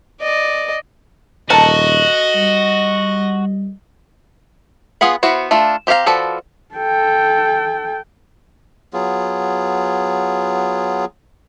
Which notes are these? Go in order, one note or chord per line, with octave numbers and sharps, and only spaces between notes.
D5 D#5
D#1 F#4 A4 A#4 D#5 A5
G3
B3 F4 G#4 F#5 B5
B3 E4 F#4 C5
A3 D4 F4
C4 G4 A4 F5 A#5
F3 F#4 A4 B4 D5
A4 G5
F#3 B3 F4 G#4